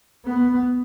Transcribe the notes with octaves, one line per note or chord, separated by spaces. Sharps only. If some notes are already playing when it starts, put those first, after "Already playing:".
B3